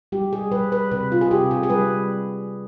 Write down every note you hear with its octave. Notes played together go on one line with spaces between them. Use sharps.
G3 G4
G#4
G3 B4
B4
C3 B4
F4
G#4
C3 G4
G#4
G#4
G3 B4